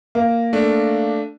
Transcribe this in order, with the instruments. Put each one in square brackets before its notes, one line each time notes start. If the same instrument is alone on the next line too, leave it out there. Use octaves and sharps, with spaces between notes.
[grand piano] A#3
[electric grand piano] A3 D4